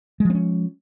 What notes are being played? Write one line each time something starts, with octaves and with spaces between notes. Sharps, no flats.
F3 G#3 C4 C#4